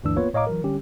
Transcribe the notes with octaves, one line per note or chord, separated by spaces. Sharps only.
D2 G2 E3 D4 E6
A#3 B3 F4 B4 C#5
A2 C#5 D#5 F5 A#5 D6
E3 F#3 A#4
D3 G3 C#4 G4